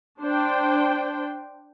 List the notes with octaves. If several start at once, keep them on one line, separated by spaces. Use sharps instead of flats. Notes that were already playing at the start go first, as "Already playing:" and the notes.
D4 C5 G5